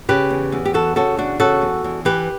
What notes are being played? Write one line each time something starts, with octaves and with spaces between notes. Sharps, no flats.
C#3 G4 B4
E2
E2
G4
E3 F#4 A4
C#3 F#4 A4
E2 D4 F#4
C#3 F#4 A4
E2
E2
E3 G4 B4